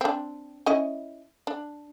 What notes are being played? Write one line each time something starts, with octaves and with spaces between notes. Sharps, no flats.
C4 D4
C#4 E4 D#5
D4